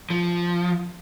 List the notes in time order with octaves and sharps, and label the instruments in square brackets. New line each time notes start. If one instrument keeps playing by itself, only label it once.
[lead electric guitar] F3